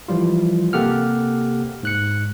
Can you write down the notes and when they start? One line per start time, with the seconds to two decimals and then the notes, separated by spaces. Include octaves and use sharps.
0.08 E3 F3 G3 F4
0.73 C3 A#3 G4 A4 F#5 F6
1.83 G#2 F#6 C#7